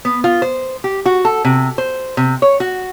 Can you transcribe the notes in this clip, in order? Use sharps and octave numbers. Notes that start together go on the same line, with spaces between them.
B3
F4
C5
G4
F#4
A4
C3
C5
C3
C#5
F#4